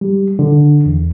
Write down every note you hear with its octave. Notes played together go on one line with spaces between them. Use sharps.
G3
D3
E2